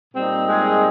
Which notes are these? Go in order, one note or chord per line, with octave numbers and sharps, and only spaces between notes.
A#2 G3 C4 D#4
G#3 G#4